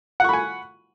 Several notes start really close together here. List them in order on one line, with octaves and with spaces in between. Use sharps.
F#5 C#6 B5 G#5